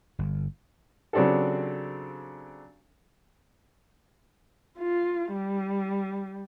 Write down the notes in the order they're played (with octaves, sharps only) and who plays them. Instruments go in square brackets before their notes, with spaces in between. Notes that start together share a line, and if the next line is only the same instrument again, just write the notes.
[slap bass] G1
[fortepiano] C#3 F#3 C4 D4 G4 A4
[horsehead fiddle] F4
G3